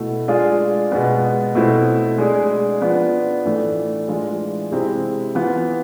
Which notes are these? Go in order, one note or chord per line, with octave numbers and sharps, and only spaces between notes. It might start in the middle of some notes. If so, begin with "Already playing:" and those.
Already playing: B2 A3 E4
G#3 D4 F4 G#4
B2 G#3 B3
B2 A3 C4 E4
G#3 D4 G#4
F3 B3 D4 F4
A2 E3 A3 D4
E3 G#3 D4 F4
C3 G#3 C4 E4 G#4
E3 B3 F4